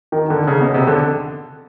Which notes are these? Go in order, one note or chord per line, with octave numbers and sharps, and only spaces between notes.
D#3
D3
C#3
B2
C#3
C3
D3